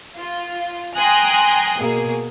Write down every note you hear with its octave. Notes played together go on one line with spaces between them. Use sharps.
F4
G5 G#5 A#5 C6 D#6 F#6
B2 A#3 G#4